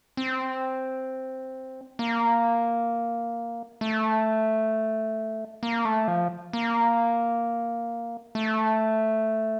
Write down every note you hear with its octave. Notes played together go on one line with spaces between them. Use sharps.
C4
A#3
A3
A#3
A3
F3
A#3
A3